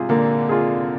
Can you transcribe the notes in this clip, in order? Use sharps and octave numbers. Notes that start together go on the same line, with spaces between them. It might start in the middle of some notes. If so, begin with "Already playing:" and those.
Already playing: G#2 C3 F4 G#4
A#2 D3 A#3
F4 G#4